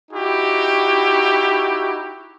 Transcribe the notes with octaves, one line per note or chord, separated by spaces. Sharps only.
D#4 E4 F#4 G4